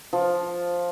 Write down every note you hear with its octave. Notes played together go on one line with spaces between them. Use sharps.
F3